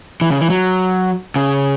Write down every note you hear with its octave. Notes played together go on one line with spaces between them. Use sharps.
E3
C#3
E3
F#3
C#3